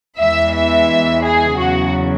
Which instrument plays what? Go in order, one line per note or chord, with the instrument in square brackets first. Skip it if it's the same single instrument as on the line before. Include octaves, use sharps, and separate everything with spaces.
[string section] E2 E3 G#3 E5
E5
G#4
E2 C#3 F#3 F#4